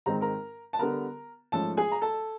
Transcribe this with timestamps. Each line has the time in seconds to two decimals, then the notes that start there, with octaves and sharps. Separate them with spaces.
0.06 G#2 D#3 G#3 C4 A#5
0.21 A#4 A#5
0.73 A5
0.79 D3 G3 B3 A#4 A#5
1.52 G#2 F3 A3 C#4 A4 A5
1.77 G#4 G#5
1.92 A#5
2.02 A4 A5